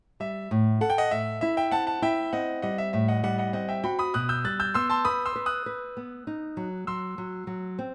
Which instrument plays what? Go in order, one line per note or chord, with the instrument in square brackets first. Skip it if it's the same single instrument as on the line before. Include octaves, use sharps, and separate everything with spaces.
[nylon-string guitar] G3 [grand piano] E5
[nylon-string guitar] A2
[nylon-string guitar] A4 [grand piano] F#5
[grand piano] G5
D#5 F#5
[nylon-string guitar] A2 [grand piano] E5
[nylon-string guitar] E4 [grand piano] E5
[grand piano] E5 G5
[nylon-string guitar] C4 [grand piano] F#5 A5
[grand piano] F#5 A5
[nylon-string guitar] E4 [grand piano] E5 G5
[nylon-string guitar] C4 [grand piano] D#5 F#5
[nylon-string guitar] G3 [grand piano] D#5 F#5
[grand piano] E5
[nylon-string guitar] A2 [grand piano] E5
[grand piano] D#5 F#5
[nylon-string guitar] G3 [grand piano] D#5 F#5
[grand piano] D#5 F#5
[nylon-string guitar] C4 [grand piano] D#5 F#5
[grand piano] E5 G5
[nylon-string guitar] F#4 [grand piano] G5 B5
[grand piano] B5 D#6
[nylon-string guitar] B2 [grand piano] D#6 F#6
[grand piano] E6 G6
[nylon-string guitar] G3 [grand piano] F#6 A6
[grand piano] E6 G6
[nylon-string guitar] B3 [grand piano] C6 E6
[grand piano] A5 C6
[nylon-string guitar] B4 [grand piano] B5 D#6
[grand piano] C6 E6
[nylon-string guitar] B4
[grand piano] D#6 F#6
[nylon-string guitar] B4
B3
D#4
F#3
[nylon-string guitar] F#3 [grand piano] C6 E6
[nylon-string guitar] F#3
F#3
C4